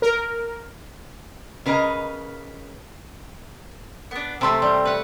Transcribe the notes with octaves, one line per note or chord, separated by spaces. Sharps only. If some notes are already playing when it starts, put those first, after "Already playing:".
A#4
C#3 A#4 B4 D#5 G#5 A#5
B3 D4
C3 A3 C4 C6
G3
B4 F#5